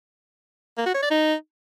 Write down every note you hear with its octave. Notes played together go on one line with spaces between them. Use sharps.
A#3
F#4
C#5
D5
D#4